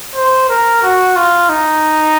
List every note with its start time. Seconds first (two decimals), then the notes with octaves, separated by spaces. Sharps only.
0.16 C5
0.49 A#4
0.83 F#4
1.16 F4
1.49 D#4